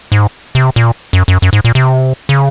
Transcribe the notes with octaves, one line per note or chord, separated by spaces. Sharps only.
G#2
C3
A#2
F#2
F#2
F#2
G#2
A#2
C3
C#3